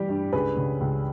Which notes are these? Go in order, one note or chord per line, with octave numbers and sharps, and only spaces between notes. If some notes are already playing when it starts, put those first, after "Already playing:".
Already playing: E3 G3 G4
G2
C#2 G#4 B4
C#3
C#2